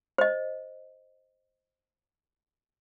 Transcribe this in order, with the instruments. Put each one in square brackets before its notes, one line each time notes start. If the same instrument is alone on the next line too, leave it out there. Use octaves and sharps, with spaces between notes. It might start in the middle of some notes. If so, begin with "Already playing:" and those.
[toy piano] C5 D#5